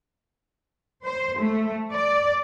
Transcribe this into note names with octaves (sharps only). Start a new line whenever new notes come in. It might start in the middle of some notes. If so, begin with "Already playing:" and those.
C5
A3
D5